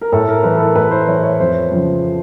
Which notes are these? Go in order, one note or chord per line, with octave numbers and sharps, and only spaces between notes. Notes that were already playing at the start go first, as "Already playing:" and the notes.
A#4
A2 A4
A#4
E3 B4
A4
A#4
A2 B4
C5
E3 C#5
C#5
F2 C5
C#3 F3